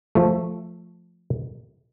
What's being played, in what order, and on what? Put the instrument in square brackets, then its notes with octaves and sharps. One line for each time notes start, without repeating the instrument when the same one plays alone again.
[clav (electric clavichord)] F3 A3